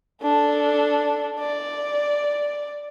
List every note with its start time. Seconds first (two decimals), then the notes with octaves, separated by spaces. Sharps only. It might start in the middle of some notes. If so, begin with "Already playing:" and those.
0.22 D4 A4
1.39 D5